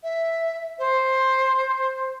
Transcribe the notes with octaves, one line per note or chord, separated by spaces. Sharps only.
E5
C5